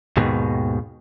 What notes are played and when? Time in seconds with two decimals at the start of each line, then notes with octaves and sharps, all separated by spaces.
0.17 D#2 G#2 B2 D#3